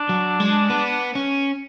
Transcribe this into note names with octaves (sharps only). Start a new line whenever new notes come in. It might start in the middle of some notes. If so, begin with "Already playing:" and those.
Already playing: D4
F#3
G#3
B3
C#4